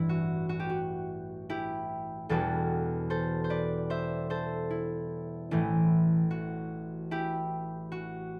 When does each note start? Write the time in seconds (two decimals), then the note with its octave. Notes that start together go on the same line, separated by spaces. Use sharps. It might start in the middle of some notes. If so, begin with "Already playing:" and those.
Already playing: A1 G2 E3 E4
0.09 F#4
0.49 F#4
0.60 G4
0.69 F#4
1.50 E4 G4
2.29 E1 E2 B2 G3 F#4 A4
3.10 A4 C5
3.44 C5
3.50 B4 D5
3.90 C5 E5
4.30 A4 C5
4.70 E4
5.51 A1 A2 E3 A3 E4
6.31 F#4
7.11 E4 G4
7.92 F#4